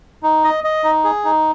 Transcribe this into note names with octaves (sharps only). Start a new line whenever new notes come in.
D#4
D#5
D#5
D#4
G#4
D#4